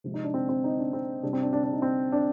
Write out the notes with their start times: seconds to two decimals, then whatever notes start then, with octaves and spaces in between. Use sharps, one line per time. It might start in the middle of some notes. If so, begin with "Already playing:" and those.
0.04 C3 F3 G#3
0.14 D#4
0.24 D4
0.34 C4
0.49 C4
0.64 D#4
0.78 D4
0.93 C4
1.23 C3 G3 D4
1.33 C4
1.42 D4
1.53 D4
1.63 D4
1.73 D#4
1.82 C4
2.12 D4